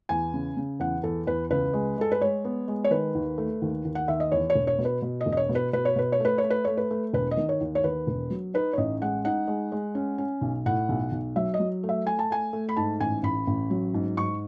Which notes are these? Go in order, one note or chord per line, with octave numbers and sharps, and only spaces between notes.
E2 G#5
C#3
C#3
E2 F#5
E2 A4
E2 B4
C#2 B4
G#3
G#3 A4
B4
G#3 C#5
B3
G#3
C#5
D#3 B4
D#2
A3
D#2
D#2
F#5
D#2 E5
D#5
E2 C#5
C#5
E1
C#5
B2
B4
B2
D#5
E1
D#5
C#5
B2
B4
B2 B4
C#5
B2 B4
C#5
A3 B4
C#5
A3
B4
A3 C#5
B4
A3
E1 B4
D#5
D#3
C#5
D#2
C#5
D#2 B4
E1
F#3
D#4 B4
C#5
A1 D#5
G#3 F#5
D#4 F#5
G#3
G#3
C#4
C#4
B1
A2 F#5
B1
B1
F#3 E5
D#5
F#3
A3
E5
A3 G#5
A5
A3 G#5
A3
B5
G#2 A5
A1 G#5
A1 B5
A1
F#3
G#2
G#2 C#6